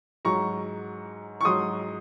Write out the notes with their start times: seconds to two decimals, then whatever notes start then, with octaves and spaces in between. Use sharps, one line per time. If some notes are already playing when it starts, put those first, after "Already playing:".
0.25 G#2 F#3 A#5 C#6
1.41 C#6
1.45 G#2 F#3 C6 D#6